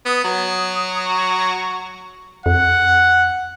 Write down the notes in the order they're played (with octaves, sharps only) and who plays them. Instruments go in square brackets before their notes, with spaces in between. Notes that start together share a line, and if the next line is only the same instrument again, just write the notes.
[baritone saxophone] B3 [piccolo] D#6
[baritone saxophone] F#3
[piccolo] C#6
[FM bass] F2 [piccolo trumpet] F#5